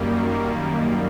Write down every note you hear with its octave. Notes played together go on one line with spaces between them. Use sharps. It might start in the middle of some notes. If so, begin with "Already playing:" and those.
Already playing: F#2 D#3 G3 A#3
C#6
D6